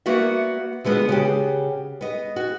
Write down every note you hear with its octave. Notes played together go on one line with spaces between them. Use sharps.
A#3 B3 F#4 D5 E5
D3 G#3 B3 D#4 F4 F#4
C#3 F#4 G4
B3 D#5
F#4